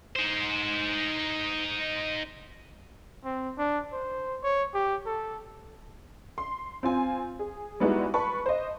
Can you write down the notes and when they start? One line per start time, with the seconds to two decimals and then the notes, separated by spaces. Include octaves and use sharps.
0.16 D#4 C5
3.24 C4
3.58 D4
3.93 C5
4.43 C#5
4.74 G4
5.06 A4
6.38 C6
6.83 C4 F4 G#5
7.39 G#4
7.80 G3 G#3 B3 D#4 E4 F#4
8.14 B4 A5 B5 C#6
8.46 C5 D#5